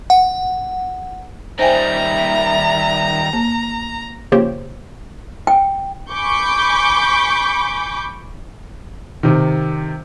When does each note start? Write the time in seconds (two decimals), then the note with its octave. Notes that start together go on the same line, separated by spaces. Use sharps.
0.10 F#5
1.59 D#3 G3 C5 E5 G5 G#5 A#5
3.33 A#3
4.32 C#3 F3 A#3 G4 C5 C#5
5.47 G5
6.12 G#5 B5 C#6 D6 G6
9.23 C3 D#3